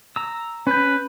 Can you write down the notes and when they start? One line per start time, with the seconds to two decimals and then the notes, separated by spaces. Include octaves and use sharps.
0.16 A#5 E6
0.67 C#4 B4 G6